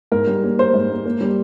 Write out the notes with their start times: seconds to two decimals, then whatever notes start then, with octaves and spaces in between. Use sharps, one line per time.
0.12 G#2 A#4
0.27 G3
0.44 A#3
0.59 A#3 C5
0.74 G#2
0.90 A#3
1.06 A#3
1.21 G3